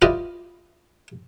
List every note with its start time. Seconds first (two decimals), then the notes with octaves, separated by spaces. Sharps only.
0.02 E4 F4 G4 B4 D5 D#5